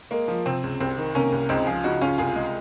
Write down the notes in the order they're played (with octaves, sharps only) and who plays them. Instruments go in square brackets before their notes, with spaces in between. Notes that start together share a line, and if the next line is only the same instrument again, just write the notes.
[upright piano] G#3 A#3
F3
C3 C4
C#2
C2 C4
D#3
C3 A#3 C#4
C2
C#2 C4 D#4
F3 F4 G#4
C#3 D#4 F#4
C#2 C#4 F4
C2 F4 G#4
G#3